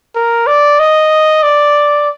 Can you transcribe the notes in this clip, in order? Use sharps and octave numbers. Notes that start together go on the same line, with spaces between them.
A#4
D5
D#5
D5